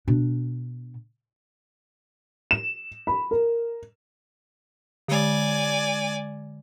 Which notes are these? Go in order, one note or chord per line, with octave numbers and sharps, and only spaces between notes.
B2 D4
E7
B5
A#4
D3 G#3 D5 G#5